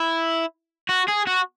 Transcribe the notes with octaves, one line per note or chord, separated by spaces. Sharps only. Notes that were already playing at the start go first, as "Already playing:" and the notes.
Already playing: E4
F#4
G#4
F#4